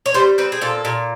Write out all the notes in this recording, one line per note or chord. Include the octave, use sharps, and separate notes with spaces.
C#5
G3 C5
C4 B4
G#4
A#2 A4
A#2